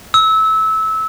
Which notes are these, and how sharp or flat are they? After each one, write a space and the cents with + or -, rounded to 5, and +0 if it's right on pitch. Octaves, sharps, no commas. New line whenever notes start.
E6 -20